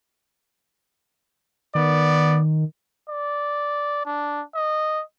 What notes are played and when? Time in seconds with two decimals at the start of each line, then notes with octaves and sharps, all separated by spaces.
1.75 D#3 B3 D5
3.09 D5
4.06 D4
4.55 D#5